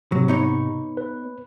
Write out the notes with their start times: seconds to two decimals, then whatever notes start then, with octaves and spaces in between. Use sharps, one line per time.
0.12 G#2 C3 F#3
0.28 B3 D#4 C#5
0.97 B4